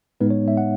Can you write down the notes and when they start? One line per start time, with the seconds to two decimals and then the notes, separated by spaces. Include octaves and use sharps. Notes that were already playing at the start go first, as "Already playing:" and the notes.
0.20 A2 G#3 B3 D#4 B4
0.30 C#5
0.48 E5
0.57 F#5